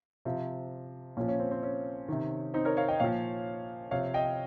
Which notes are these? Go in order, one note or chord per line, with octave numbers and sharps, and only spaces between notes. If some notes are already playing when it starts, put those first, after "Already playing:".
C3 F3
A#2 F3 C#4
C#4
C4
C4
C#4
C3 D#3
C4 D#4
A#4 C#5
C#5 F5
D#5 G5
A#2 F3 C#5 F5
C3 F3 C#5 F5
D#5 G5